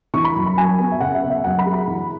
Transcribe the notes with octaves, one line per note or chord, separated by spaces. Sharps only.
E3 C#6
B5
F#2
B5
F#2 G#5
B3
E5
C#3 F#5
E5
B3
E5
F#2 F#5
B5
G#3
B5
E3